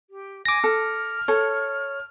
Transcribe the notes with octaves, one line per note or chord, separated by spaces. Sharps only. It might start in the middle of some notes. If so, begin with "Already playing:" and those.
G4
G#5 D6 A#6
A4 F6
A4 C#5